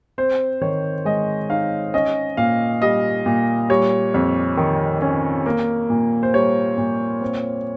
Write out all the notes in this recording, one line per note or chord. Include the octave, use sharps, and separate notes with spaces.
C4 C5
D#3 C#5
G#3 D#5
D#4 F5
C#4 D#5
A#2 F5
G3 D#5
A#2
G3 C#5
F2
D#3
C#4
A#3
A#2
C5
G3 C#5
A#2
C4